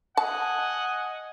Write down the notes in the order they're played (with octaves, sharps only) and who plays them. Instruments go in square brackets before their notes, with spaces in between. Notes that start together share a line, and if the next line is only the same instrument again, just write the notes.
[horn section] D#5 F#5 G#5 [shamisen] A5